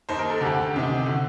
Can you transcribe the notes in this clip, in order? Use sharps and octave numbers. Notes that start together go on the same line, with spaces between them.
D#2 D#3 C5
A#4
A4
D2 D3 G4
D2 C3 D#3
D3 F#4